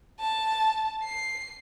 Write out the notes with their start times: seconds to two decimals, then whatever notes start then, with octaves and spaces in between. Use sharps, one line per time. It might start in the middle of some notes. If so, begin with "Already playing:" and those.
0.20 A5
1.04 C7